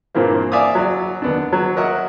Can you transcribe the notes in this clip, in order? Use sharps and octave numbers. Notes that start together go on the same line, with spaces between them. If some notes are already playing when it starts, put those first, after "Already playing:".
G2 A#2 E3 A#3 C4
D5 E5 F5 G#5 D6 D#6
F#3 D5
D#2 B3 D4
F#3
A#4 C#5 D#5 E5 F#5